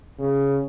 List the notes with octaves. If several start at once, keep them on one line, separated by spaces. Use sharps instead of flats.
C#3